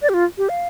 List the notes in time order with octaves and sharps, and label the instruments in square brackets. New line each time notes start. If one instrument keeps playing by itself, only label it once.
[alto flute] D5
G4
F4
G4
F5